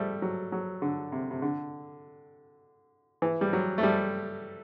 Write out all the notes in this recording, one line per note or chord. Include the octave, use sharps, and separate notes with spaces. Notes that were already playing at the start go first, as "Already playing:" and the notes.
Already playing: G3 A3
F#3
F#3
D3
C3
C3
D3
E3
G3
F#3
A3
G3